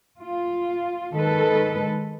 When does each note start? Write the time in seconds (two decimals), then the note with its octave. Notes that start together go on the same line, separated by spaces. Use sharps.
0.20 F4
1.12 D#3 G#3 A4 B4